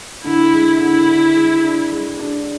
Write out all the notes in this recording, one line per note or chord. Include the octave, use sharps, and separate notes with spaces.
D3 E4
G#3
D3 E4
D3
G#3
D4
G#3
D4